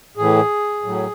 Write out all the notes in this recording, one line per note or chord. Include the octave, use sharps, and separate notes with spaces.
A2 E3 G#4
A2 F#3